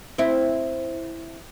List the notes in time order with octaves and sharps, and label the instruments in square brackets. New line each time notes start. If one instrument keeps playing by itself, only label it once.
[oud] C4 E4